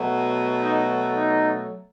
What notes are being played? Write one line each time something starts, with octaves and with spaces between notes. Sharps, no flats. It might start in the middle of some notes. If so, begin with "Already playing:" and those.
Already playing: B2 F#3 A3
D#4
D#4